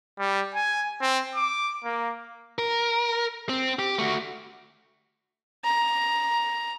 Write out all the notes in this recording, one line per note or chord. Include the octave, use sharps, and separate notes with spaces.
G3
G#5
C4
D6
A#3
A#4
C4
G4
A3 F#4
A#5